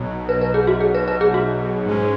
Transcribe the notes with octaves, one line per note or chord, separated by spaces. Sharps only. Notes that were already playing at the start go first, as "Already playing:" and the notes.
Already playing: B1 B2 F#3
B4
B4
G#4
F#4
G#4
B4
B4
G#4
F#4
G#2 G#3 C#4